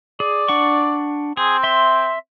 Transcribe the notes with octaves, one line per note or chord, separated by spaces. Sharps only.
G#4 D5
D4 F#5 C#6
C4 G#4
E5 C6